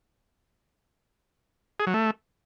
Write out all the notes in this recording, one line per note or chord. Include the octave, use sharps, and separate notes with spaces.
G#4
F#3
A3